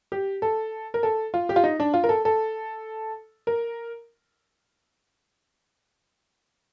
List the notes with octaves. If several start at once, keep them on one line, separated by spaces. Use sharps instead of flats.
G4
A4
A#4
A4
F4
G4
F4
D#4
D4
F4
A#4
A4
A4
A#4